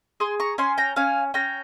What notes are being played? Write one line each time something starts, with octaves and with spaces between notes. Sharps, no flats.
G#4 C6 D#6
A#5 C#6
C#4 G#5 C6
G5 A#5
C#4 F5 G#5
C#4 G5 A#5